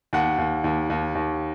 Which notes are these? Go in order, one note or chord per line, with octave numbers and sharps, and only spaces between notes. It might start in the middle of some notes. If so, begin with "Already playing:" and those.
D#2 F#5
D#2
D#2
D#2
D#2